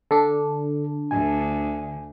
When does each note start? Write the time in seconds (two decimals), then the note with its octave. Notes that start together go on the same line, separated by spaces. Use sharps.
0.11 D3 D4 A4
1.11 D2 G#5